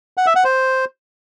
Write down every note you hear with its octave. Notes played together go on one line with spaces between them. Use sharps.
F#5
E5
F#5
C5